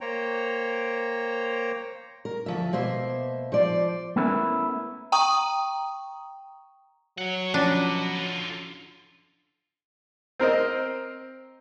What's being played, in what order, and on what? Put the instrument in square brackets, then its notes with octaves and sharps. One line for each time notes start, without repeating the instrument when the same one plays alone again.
[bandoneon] A#3 C5 C#5 G5 A#5
[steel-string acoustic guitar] A#4
D2 F3 E5
B2 A#3 C5 E5
F3 C5 D5
[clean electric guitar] A3 B3 C#4 E4 A4 A#4
[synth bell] G5 A#5 C#6 D#6
[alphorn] F#3 [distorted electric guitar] C#5 F#5
[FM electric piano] F3 C#4 [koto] D4 [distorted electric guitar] F#4 B4
[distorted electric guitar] D3 F4
[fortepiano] C4 A#4 C5 D#5